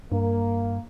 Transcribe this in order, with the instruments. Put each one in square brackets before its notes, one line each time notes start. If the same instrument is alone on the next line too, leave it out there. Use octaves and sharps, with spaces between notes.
[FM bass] G2 [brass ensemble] A#3